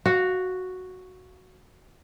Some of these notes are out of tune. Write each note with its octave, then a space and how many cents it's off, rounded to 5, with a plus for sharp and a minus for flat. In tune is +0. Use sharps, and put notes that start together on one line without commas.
F#4 +0 F5 +20